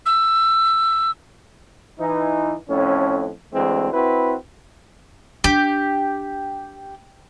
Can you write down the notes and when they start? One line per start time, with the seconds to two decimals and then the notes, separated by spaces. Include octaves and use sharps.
0.06 E6
1.99 E3 D#4
2.69 F2 A2 C#4
3.54 D2 E3 G#3 C4
3.92 C4 E4 F#4 B4
5.44 D4 G4